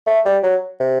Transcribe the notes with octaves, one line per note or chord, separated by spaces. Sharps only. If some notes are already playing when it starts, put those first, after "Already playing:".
A3
G3
F#3
C3